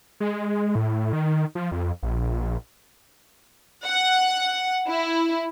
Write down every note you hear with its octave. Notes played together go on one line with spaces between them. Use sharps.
G#3
A2
D#3
F3
F2
A#1
F#5
E4